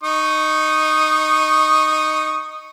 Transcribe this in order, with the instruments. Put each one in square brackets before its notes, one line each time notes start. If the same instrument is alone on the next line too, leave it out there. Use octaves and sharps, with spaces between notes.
[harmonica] D#4 C#6 D#6